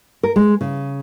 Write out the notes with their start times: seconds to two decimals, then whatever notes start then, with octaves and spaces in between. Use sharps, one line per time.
0.23 A#4
0.36 G#3
0.61 C#3